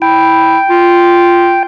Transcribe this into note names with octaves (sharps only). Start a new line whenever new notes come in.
E4 G5
F4